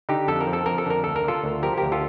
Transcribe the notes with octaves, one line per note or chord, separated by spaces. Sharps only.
D3 D#4 G4
F2 A4
A#4
F3
A4
F2 A#4
A4
D3 A#4
D2 A4
A#4
D3 F4 A4
D2
F3 G4 A#4
D2 G4 A#4
F4 A4